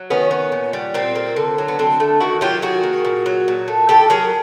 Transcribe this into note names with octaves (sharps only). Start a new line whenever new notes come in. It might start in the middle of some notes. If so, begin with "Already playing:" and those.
Already playing: F#3
D#3 B3 C#4
B3
A#2
G3
A#2 C4
A#3
D3
F#3
B3
D3 C4
A3
D#3 E4 F#4
F#3 F4 G4
D#3 F#4 G#4
A#3
A#2
F#3
A#2
A3
A2 G4 A4
F#3 G#4 A#4